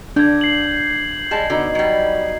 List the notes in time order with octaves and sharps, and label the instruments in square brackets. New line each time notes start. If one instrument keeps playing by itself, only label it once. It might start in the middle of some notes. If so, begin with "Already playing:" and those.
[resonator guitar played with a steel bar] D3 [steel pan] D4 [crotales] G6 G#6
[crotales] C7 F#7
[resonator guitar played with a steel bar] G3 G#3 A5
[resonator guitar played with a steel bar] D3 [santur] B3 D#4 F#4
[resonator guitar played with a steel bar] F#3 G3 [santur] G#5